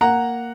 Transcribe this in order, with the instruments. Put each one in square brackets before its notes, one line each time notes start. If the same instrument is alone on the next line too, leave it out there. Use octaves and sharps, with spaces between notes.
[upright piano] A#3 F#5 A#5